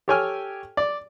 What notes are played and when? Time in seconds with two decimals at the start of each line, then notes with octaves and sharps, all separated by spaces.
0.08 G4 A4 C#5 G5 G#5 F6
0.77 D5